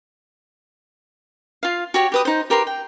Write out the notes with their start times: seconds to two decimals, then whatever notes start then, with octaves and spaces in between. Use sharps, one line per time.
1.63 F4 F5
1.94 F#4 G4 C#5
2.12 G4 B4 D#6
2.25 D#4 C5
2.50 G4 A#4 B4 C6
2.67 G5